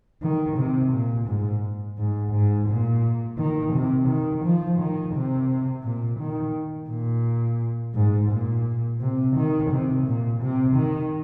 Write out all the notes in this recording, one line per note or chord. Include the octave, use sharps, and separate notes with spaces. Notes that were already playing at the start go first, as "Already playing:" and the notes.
D#3
C3
A#2
G#2
G#2
G#2
A#2
D#3
C3
D#3
F3
D#3
C3
A#2
D#3
A#2
G#2
A#2
C3
D#3
C3
A#2
C3
D#3